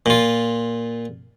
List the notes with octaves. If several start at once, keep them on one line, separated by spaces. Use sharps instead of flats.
A#2 F4